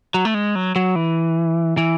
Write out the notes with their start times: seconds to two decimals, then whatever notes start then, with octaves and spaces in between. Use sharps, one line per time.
0.14 F#3
0.25 A3
0.34 G#3
0.55 F#3
0.76 F#3
0.96 E3
1.77 E3